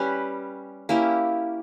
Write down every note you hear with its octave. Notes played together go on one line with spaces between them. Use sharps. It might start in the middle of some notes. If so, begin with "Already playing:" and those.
Already playing: G3 C#4 G4 B4
A#3 C#4 E4 G4